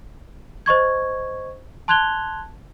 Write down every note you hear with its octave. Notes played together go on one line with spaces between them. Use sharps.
C5 D#5 C#6 G#6
A5 C6 F#6 G#6 F7 G7